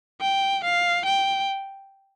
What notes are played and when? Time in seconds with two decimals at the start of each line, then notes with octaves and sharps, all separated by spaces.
0.21 G5
0.64 F5
1.05 G5